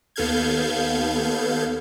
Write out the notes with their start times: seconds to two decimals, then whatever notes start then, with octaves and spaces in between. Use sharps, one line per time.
0.16 D#2 B3 A4 F5 G6 G#6